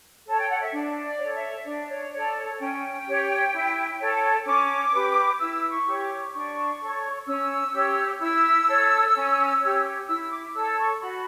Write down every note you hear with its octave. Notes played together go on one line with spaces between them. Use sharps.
A4 C#5 A5
G5
F#5
E5
D4 D5
D5
A4 C#5
E5
D4 D5
C#5
A4 C#5 D5
C#5
C#4 G5
G4 C#5
E4
A4 C#5
C#4 D6
G4 B4
E4 E6
C#6
G4 C#5
D6
D4 C#6
A4 C#5
C#4 E6
G4 C#5
E4 E6
A4 C#5
C#4
G4 C#5
E4 E6
D6
A4 C#5 E6
C#6
F#4 B5